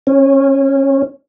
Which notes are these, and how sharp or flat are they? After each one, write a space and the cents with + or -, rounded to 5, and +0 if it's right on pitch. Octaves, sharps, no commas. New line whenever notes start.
C#4 -25